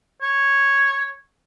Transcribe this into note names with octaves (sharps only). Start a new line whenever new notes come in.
C#5